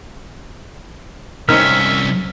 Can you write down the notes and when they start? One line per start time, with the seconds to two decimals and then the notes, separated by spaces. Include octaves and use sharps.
1.49 C2 C4 C#4 D#4 A#4 E5 F6